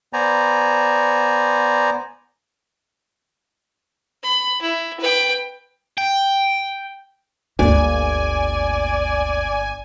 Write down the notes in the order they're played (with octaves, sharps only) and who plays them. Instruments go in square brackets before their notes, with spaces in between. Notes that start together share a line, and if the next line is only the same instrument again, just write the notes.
[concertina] B3 C5 D5 G#5 A#5
[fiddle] B5
E4
B4 G5
[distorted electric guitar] G5
[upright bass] G1 A#3 [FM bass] D2 [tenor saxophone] D5 [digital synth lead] G#5